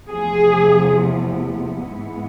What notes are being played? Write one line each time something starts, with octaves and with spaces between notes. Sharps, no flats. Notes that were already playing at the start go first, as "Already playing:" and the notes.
E2 C3 F3 A3 G#4
G#2 E3 G#3 B3